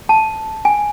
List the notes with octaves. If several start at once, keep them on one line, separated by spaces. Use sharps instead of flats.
A5
G#5